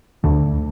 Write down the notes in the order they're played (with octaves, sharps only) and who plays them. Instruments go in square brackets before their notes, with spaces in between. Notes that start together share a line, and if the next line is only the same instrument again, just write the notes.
[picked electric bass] D2 D3